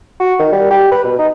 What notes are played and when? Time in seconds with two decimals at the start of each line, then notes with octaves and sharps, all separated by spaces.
0.20 F#4
0.39 D#3
0.52 G3
0.71 G4
0.91 B4
1.05 B2
1.19 D#4